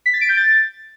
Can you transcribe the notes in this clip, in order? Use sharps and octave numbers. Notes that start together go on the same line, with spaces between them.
B6
A6
D7
G6
A6